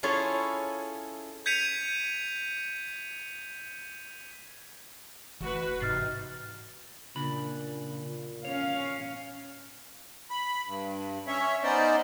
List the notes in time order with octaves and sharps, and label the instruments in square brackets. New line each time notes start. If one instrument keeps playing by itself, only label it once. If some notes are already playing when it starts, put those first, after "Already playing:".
[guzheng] C#4 E4 F4 G#4 A4 C#5
[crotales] G6 G#6 B6 C#7 D#7 F7
[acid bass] F#1 [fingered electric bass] E3 A3 [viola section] F#4 B4
[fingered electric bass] A1 G#2 [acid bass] C3 [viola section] D#4 [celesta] F6 A6 C7
[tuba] A#2 [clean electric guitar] C#3 D4 B5
[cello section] C#4 F5 [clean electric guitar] C#5
[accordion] B5
G2
C#4 C#5 E5
B3 C#4 D#4 C5 D5 D#5